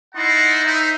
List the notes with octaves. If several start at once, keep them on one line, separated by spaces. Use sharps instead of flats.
D#4 E4 D#5 F#5 A5 C6
D#4 C5 E5